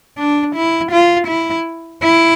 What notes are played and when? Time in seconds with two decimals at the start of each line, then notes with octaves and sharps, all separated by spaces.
0.18 D4
0.55 E4
0.92 F4
1.28 E4
2.03 E4